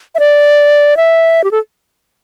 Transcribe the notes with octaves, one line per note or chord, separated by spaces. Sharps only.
E5
D5
E5
G4
A4